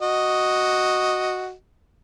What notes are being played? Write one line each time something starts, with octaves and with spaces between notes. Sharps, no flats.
F#4 D#5